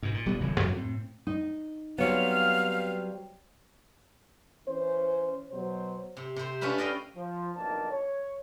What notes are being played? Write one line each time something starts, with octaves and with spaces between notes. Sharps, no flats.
G#2 B2
A#2
D#1 G3 B3
D1 C#3 E3 G#3
F2 G#2
A2 C4
D#4
F#3 G3 B3 C4 C#5 F5
E3 C#4 C5
B2 F#3 C5
C3
C3 C5
C#4 D4 F4 B4 E5
D5 D#5 F5 G5
F3
B1 F2 D#3 A#3 D4 A5
C#5